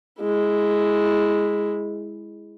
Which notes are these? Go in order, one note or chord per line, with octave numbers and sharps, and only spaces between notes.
G#3 E4